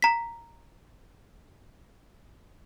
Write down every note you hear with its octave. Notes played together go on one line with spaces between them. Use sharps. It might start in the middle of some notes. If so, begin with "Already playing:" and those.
A#5 B6